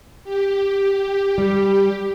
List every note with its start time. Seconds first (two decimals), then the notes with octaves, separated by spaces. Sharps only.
0.24 G4
1.38 G3